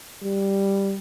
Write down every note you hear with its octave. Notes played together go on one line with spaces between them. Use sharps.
G3